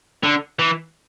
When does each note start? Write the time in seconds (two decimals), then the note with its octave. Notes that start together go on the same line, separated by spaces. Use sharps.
0.24 D3
0.59 E3